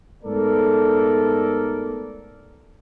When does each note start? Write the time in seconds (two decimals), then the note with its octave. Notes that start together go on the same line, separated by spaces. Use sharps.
0.24 G#2 A3 B3 A4 A#4 D5